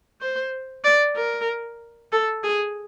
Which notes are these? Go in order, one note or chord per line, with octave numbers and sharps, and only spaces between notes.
C5
D5
A#4
A4
G#4